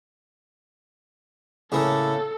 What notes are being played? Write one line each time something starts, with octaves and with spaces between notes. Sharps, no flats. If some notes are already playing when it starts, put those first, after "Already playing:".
A2 C#3 A#3 A4